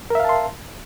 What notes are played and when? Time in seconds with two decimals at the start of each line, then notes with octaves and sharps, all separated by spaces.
0.10 A#4
0.15 E5
0.20 F5
0.25 A5
0.29 C6